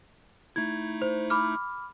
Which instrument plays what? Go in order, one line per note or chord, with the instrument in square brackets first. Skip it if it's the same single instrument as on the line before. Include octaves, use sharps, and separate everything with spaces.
[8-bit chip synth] A3 D#4 E4 [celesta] G#6
[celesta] C5
B5 D6 F6